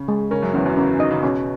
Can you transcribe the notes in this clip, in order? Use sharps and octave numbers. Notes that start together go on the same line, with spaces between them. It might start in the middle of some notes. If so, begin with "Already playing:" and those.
Already playing: C#3 C#4
G#3
C#3 C#4 A#4
F#2 F#3
E2 E3 C#4
F#2 F#3
C#3 C#4
D#3 D#5
C#3
B2 C#4